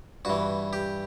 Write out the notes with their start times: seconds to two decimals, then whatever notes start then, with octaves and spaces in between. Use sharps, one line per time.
0.25 G2 E3 F#4
0.73 G4